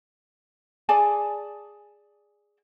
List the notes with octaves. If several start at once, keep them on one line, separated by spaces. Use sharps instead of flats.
G#4 D5 G#5 A5